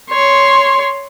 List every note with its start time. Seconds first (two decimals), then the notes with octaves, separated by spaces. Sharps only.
0.10 C#5 C6